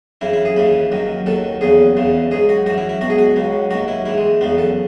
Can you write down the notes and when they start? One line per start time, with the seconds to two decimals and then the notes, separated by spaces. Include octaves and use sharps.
0.21 F#2 C#3 E3 E4
0.33 E4
0.45 G#4
0.56 D#2 C#3 E3 B4
0.92 F#2 D#3 F#3
1.26 D#2 D#3 F#3 A4
1.61 E2 C#3 F#3 G#4
1.97 E2 C#3 E3
2.31 G#2 F#3 G#4
2.49 F#4
2.66 F#2 F#4
2.70 E3
2.78 E4
2.89 E4
3.01 C#2 B2 F#3 F#4
3.10 G#4
3.19 F#4
3.36 C#2 C#3 F#3
3.71 D#2 D#3 F#3 F#4
3.88 E4
4.05 G#2 E3 E4
4.18 G#3
4.41 E2 C#3 F#3 B3
4.58 A4